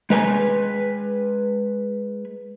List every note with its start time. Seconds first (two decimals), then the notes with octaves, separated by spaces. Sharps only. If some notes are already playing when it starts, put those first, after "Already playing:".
0.10 G#3 B4 G#5